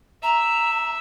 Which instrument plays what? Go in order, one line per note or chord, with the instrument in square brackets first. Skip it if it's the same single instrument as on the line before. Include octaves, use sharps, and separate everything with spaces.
[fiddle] E5 [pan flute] A#5